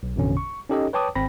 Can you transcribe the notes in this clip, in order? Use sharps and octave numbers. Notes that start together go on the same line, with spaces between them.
B1
A1 F2 B2 D3 C#4
C#6
C#4 D#4 G4 A4 C#5 D#5
B4 C#5 G5 A5 D6 D#6
G#1 C4 G5 B5 A#6